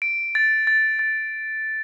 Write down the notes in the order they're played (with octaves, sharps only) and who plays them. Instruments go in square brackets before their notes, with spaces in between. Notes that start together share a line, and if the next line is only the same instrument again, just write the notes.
[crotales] D7
A6
A6
A6